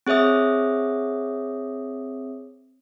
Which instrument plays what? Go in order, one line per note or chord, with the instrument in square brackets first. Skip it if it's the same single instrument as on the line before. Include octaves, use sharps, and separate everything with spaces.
[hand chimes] C4 G#4 C#5 E5 D#6